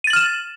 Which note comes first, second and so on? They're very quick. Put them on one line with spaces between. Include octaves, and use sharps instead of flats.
D#7 A6 F#7 F6 E7